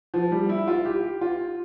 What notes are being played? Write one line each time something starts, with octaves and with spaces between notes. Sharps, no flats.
F3
G3
E4
F4
G4
F4